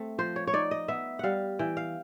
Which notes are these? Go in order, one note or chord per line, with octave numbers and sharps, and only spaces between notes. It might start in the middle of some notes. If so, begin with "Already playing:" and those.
Already playing: A3 C4
F3 C5
C#5
C#5
D#4 D5
D#5
B3 E5
G3 F5 F#5
E3 G5
F5